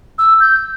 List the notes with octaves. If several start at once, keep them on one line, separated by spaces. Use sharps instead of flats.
E6
G6